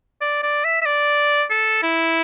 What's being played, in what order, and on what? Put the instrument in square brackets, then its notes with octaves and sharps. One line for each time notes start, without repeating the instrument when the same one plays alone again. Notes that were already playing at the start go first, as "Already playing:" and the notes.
[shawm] D5
D5
E5
E5
D5
A4
E4